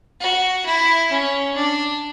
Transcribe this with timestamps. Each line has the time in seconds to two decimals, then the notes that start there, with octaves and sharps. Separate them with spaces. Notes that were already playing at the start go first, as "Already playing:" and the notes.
0.20 F#4
0.65 E4
1.12 C#4
1.56 D4